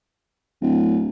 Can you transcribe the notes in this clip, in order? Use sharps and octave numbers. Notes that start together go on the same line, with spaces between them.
D1